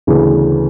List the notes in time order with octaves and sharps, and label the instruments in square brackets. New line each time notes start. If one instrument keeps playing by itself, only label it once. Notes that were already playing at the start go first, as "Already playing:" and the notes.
[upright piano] D2 C#3 E3 B3